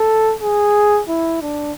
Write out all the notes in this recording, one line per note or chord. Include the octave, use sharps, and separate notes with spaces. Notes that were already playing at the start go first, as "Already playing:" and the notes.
Already playing: A4
G#4
E4
D4